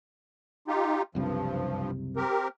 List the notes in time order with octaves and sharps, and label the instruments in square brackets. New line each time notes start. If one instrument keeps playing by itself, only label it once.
[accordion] D#4 F4 G4
[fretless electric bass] F#1 C2 C3 [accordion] G2 F3
[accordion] C4 G4 A#4